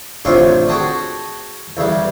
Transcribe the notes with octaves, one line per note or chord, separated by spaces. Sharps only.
A1 C3 D4 F4 C#5 G5
F#4 G#4 G5 A5 D#6
E2 C#3 G3